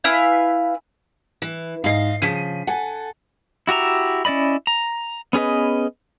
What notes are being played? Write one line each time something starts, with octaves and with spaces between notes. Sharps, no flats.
E4 B4 F5 G#5
E3
G#2 D#5 F5 C7
C#3 F3 B6 D#7
A4 F#5 G#5
E4 F#4 G4 E5 A#5
C#4 E4 D5 D#5 B5
A#5
B3 C#4 G#4 B4 D#5